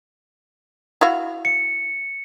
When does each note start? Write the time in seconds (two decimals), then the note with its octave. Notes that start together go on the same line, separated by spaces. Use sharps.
1.01 E4 F#4 F5
1.45 C#7